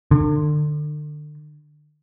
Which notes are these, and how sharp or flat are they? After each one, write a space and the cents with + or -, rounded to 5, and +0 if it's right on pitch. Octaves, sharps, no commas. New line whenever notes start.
D3 +35